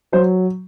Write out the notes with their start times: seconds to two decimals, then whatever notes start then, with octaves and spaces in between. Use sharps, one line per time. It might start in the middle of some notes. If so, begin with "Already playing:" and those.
0.12 F#3 C5